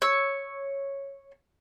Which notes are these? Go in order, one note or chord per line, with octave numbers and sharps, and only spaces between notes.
C#5 E6